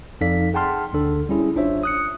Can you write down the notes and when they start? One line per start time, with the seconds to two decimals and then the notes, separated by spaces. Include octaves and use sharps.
0.21 F2 D#4 A4 D5 F5 B6
0.54 G#4 F#5 G5 A5 C6 F6
0.93 D2 D3 D4 A4
1.29 G3 C#4 E4 G#4
1.56 G#1 D4 F4 C5 C#5 E5
1.83 D#6 F#6 C#7